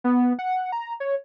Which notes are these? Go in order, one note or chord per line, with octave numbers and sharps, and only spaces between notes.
B3
F#5
A#5
C#5